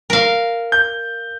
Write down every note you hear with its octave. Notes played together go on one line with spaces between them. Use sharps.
A#4 F5
G6